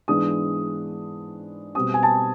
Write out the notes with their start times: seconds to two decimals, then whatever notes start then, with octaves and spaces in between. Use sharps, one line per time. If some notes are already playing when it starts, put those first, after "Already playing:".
0.08 G#2 E3 G#3 B3 D4 D#6
1.75 B2 G3 C4 D#6
1.94 G#5
2.03 A5